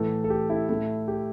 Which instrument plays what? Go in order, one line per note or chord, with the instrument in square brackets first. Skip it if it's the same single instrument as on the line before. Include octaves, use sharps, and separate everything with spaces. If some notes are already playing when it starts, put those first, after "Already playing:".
Already playing: [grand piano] A2 E3 A3 A4
A4
G4
E4
A2 A3 E4
G4